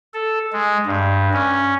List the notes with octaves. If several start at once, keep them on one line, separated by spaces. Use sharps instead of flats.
A4
G#3
G2
C#4